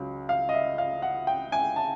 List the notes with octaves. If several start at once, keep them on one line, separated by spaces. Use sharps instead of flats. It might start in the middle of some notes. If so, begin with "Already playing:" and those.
Already playing: C#2 C#3 F#3
F5
D#5
E5
F5
F#5
G5
G#5
A5